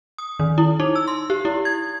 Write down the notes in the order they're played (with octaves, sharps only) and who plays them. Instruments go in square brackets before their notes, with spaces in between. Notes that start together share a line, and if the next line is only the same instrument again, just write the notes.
[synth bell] D#6
D#3
E4
D#4
E6
C6
G4
E4
G#6